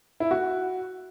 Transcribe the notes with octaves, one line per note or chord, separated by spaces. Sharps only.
E4
F#4